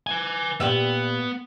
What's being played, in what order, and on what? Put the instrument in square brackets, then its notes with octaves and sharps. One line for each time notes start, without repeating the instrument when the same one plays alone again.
[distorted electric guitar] B4 G#5
[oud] A#2 G4 E5 [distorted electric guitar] B3